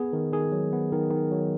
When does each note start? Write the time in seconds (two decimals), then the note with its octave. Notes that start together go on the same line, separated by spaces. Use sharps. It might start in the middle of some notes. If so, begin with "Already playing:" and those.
Already playing: B3 G#4
0.13 D#3
0.32 D#3 G#4
0.52 F#3
0.73 B3
0.92 D#3
1.11 D#3
1.31 F#3